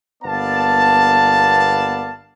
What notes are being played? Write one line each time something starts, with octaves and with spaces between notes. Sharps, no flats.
G1 A#3 B3 D5 F5 A5